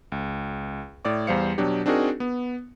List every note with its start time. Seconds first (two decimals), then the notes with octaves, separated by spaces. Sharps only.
0.12 C#2
1.05 A2 D5 D6
1.27 E2 G3 C5 F5 C#7
1.58 B2 F#3 D4 G4
1.86 C4 D4 D#4 F#4 G#4 A#4
2.20 B3